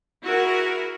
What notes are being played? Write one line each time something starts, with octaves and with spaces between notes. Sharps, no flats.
E4 F#4 G#4 A#4